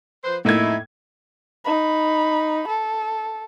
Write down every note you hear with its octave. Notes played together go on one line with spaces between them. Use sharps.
F3 B4 C5
F2 A2 A#3 D#4 E4 G#6
D#4 B5
A4